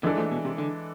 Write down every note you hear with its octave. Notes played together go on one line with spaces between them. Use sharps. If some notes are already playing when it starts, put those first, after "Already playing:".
D3 E3 F3 G#3 D4 A4
F3 A3
B2
C3
D3